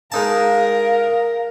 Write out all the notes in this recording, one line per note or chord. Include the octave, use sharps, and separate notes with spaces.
G#3 D#4 A#4 F5 A5